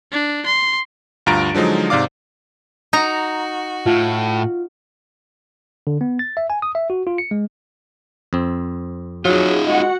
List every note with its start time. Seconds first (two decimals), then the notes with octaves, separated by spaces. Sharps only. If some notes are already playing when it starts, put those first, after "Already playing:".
0.12 D4
0.46 C6
1.26 D2 G2 F4 A#5 A6 D7
1.54 D3 F3 F#3 G#3 D#4
1.90 G#2 C3 D5 F5 D6
2.93 D#4 F#4 A#5
3.86 A2 F4
5.87 D3
6.01 B3
6.19 A6
6.37 E5
6.50 G#5
6.62 D#6
6.75 E5
6.90 F#4
7.07 F4
7.18 C#7
7.31 G#3
8.33 F2 C4
9.25 F#3 D#4 F4 G#4
9.67 G#3 F#4 F#5